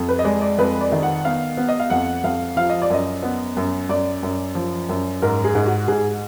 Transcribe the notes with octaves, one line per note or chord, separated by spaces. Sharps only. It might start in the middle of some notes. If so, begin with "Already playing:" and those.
Already playing: F2
B4
D#5
G#3 D5
D5
F2 B4
D5
D#3
F#5
B3 F5
B3
D#5
F5
F2 F#5
F2 F5
F3 F5
D#5
D5
F#2 D#5
B3
F#2
F#2 D5
F#2
F3
F#2
G#2 A#4
G#4
G#2
F#4
G#2 G#4